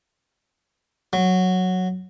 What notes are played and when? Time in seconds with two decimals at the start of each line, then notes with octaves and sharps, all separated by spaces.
1.13 F#3